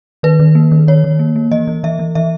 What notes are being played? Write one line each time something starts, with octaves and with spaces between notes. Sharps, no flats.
D#3 B4
D#3
A#3
D#3
D#3 C#5
D#3
A#3
A#3
E3 D#5
E3
E3 E5
E3
E3 E5